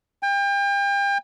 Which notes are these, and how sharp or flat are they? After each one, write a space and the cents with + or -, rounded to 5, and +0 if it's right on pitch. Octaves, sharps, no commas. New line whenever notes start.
G5 +35